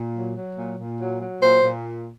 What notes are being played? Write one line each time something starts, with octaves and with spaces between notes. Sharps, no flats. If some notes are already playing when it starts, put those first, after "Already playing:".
Already playing: A#2
F#3
F#3
A#2
A#2
F#3
F#3
A#2 C5
A#2